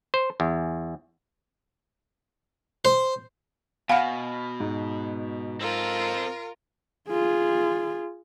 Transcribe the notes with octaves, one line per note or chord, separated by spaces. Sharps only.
C5
E2
C5
B2 F5 F#5 G#5 B5 F6
G#2
C4 F4 A4 A#4
F4 G#4